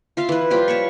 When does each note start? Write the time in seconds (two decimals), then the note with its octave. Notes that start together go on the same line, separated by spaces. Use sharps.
0.17 F4 E5 F5
0.29 E3 B4
0.50 F3 G3 F4 G4
0.68 C#5 A5 B5 C#6